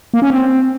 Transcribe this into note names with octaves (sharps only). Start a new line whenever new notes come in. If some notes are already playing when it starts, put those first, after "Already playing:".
A#3
C#4
C4